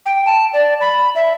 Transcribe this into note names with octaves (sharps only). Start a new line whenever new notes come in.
G5
A5
D5
B5
E5